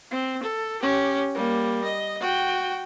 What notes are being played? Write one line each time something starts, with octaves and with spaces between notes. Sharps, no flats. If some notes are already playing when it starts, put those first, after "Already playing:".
C4
A4
C#4 G4
G3 A#3
D#5
F#4 G5